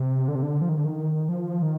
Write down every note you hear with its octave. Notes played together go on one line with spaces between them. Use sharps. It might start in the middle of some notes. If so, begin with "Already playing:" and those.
Already playing: C3
D3
C3
D3
F3
D#3
D3
D#3
F3
D#3